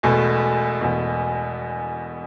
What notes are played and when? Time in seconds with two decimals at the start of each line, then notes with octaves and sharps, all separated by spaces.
0.03 E1 E2 B2 A3
0.81 E1 E2 B2